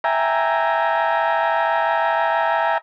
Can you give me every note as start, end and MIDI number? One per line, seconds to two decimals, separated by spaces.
0.04 2.78 76
0.04 2.78 79
0.04 2.78 80
0.04 2.78 82